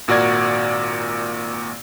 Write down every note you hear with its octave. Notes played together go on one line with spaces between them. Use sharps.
G#1 A#2 F#4 A#4 D5 G#6